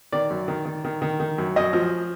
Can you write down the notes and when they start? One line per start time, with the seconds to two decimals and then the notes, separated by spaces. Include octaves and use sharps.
0.12 D#3 D5
0.30 F#2
0.48 D#3
0.65 D#3
0.84 D#3
1.02 D#3
1.20 D#3
1.38 F#2
1.56 F#2 D#5
1.73 F3